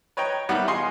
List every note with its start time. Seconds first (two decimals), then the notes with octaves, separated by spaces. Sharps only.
0.17 B4 C#5 D#5 G5 A#5
0.49 D#3 G3 B3 E4
0.67 F4 G#4 D#5 G#5 C6 C#6